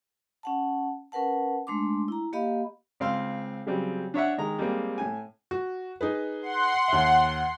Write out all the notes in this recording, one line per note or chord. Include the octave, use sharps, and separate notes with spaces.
C#4 F#5 A5
C#4 A#4 B4 F#5 A5
G#3 A3 D4 C6 D6
E4 A#5
A#3 G4 D#5 F5 B5
C#2 C4 F5 C6 E6
C#3 F#3 G3 C4
D4 C#5 E5 F#5
D#3 G#3 A#5
G3 G#3 A#3 C4
A2 G#5
F#4
D#4 G#4 B4
F#5 C6
D#2 E5